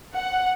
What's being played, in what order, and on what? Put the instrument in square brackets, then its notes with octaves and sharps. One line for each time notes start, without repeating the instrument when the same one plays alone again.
[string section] F#5